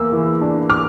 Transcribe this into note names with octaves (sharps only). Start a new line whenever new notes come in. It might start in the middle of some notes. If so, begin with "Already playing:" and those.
Already playing: E2 A#3 E6
E3
D4
D6 F6